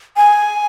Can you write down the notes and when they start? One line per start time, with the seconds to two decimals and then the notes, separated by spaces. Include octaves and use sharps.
0.17 G#5